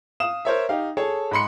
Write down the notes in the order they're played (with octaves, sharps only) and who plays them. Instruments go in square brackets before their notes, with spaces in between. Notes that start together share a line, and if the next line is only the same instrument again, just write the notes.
[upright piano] F5 D#6 E7
A#4 C5 C#5 E5
D#4 G4 F5
G#4 A4 C#5 A5
G#2 G#3 B5 C6 C#7